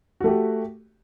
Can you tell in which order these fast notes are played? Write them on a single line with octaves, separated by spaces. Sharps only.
F#4 A3 G4